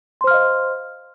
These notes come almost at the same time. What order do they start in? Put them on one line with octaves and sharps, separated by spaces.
C6 C5 F6 F5 D#5